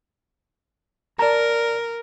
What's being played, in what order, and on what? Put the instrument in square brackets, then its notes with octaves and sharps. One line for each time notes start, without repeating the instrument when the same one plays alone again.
[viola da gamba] A#4 [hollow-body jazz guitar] D5 A5 A#5